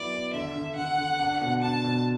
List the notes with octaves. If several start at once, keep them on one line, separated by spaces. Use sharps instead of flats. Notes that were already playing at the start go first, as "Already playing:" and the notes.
Already playing: F#3 B3 E4 D5
B3
D3 E5
D3
D3 F#5
D3
D4
B2
D4 A5
B2